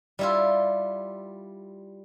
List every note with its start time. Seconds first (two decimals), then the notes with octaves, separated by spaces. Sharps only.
0.19 G3 E4 F4